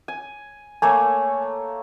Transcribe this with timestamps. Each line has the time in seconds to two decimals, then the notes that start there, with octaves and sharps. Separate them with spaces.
0.08 G#5
0.82 A3 A#3 C#5 G#5